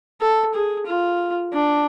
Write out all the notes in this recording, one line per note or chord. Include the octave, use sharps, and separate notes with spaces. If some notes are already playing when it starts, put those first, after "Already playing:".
A4
G#4
F4
D4